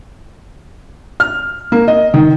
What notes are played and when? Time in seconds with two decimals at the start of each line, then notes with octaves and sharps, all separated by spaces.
1.20 F6
1.72 A#3
1.88 D#5
2.14 D#3